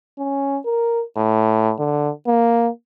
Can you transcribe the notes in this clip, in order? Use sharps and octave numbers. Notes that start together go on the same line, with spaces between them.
C#4
A#4
A2
D3
A#3